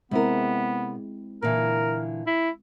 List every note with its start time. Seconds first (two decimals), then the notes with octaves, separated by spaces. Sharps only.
0.11 C3 G#3 B3 C4 E4 A#4
1.42 A#2 D3 E3 A#4
2.27 E4